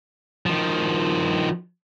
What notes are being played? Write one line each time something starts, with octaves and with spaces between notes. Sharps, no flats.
D#3 F3